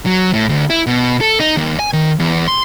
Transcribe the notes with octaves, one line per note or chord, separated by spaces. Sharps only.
F#3
A2
D2
E4
B2
A4
D#4
D#2
G#5
D#3
E2
C6